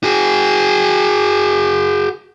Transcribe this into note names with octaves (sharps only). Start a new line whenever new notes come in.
F#4 G#4